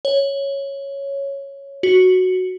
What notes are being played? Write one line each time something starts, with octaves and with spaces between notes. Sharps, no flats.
C#5
F#4